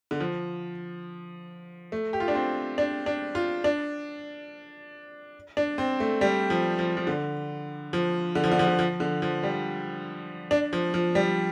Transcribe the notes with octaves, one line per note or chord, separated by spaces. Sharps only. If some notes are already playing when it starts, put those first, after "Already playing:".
D3
F3
A3
G4
F4
D4
C4
D4
D4
F4
D4
D4
C4
A3
G3
F3
F3
F3
D3
F3
D3
F3
D3
F3
D3
F3
D3
F3
G3
D4
F3
F3
G3